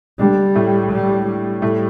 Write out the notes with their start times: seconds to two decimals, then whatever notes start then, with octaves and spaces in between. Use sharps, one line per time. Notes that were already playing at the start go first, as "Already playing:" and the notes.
0.19 D3 G3 D4
0.55 A2 A3
0.92 G3
1.27 G3
1.62 A2 A3